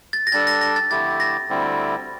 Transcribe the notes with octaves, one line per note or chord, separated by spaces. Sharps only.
A6
A#6
G3 D4 A4 A6
A#6
A#6
A6
F2 D3 A3 E4 G4 A6
A#6
D2 D3 G3 C4 E4